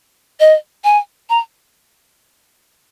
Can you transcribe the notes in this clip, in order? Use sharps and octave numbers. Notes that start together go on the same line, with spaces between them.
D#5
G#5
A#5